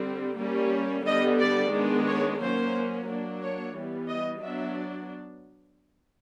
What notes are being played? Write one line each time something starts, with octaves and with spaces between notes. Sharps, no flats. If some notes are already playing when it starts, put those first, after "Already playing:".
Already playing: D3 G3 C4
G3 A#3 C#4
D3 G3 B3 D#5
D5
D#3 G#3 B3 D4
C#5
F#3 A#3 C#4 C5
F#3 A#3 D4
C#5
E3 G3 B3
D#5
F#3 B3 D4 E5